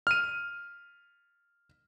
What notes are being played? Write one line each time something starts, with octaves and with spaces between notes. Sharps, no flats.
F6 D#7